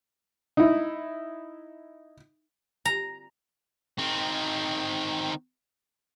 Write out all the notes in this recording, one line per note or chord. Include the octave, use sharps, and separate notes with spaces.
D#4 E4
A#5
D#3 C4